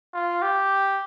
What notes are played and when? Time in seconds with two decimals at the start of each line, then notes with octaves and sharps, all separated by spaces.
0.14 F4
0.42 G4